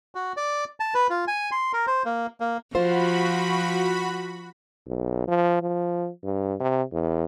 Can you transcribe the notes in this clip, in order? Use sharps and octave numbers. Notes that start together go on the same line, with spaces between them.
F#4
D5
A5
B4
F4
G#5
C6
A#4
C5
A#3
A#3
F3 F4 F#4 C5 B5
B1
F3
F3
G2
C3
E2